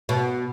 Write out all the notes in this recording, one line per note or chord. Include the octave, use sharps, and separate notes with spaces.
B2